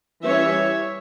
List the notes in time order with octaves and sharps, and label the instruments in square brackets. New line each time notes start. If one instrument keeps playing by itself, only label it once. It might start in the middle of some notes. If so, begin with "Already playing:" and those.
[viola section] E3 G3 C#4 C#5 E5